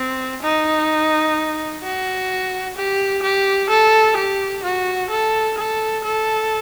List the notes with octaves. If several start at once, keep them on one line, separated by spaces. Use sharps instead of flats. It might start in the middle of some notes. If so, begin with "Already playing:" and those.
Already playing: C4
D#4
F#4
G4
G4
A4
G4
F#4
A4
A4
A4